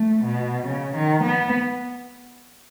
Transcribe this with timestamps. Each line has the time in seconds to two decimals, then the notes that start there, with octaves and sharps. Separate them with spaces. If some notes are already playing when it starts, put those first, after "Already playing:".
Already playing: A3
0.24 B2
0.66 C#3
0.95 D#3
1.23 B3